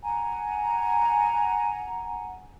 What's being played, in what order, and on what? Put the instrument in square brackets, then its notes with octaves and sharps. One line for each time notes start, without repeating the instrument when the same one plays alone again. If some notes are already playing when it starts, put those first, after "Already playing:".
[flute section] F#5 G#5 A#5